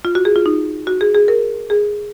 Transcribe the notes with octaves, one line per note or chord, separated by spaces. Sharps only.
F4
F#4
G#4
F4
D#4
F#4
G#4
G#4
A#4
G#4